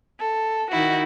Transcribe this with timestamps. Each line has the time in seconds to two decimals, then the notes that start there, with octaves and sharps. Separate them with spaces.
0.19 A4
0.70 D#3 D#4 E4 F#4